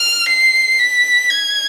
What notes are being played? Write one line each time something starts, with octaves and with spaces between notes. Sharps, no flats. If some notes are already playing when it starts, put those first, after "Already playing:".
Already playing: F6
C7
B6
G#6